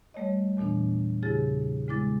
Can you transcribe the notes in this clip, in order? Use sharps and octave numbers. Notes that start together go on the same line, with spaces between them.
G3 A3 C#5 D#5
E2 A#2 E3 B3 D4
E2 C#3 E4 G4 G#4 A6
C#3 G#3 B3 E4 D6 A6